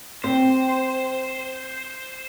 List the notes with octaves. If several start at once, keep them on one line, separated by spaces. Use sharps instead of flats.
C4 G4 C5